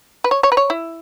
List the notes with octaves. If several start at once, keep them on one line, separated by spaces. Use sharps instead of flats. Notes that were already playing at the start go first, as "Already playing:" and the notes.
B4
C#5
C#5
B4
C#5
E4